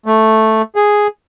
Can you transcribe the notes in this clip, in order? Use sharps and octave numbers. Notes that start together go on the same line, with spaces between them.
A3
G#4